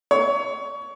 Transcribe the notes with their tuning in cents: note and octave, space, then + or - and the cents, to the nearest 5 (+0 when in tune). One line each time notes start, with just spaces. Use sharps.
C#5 +20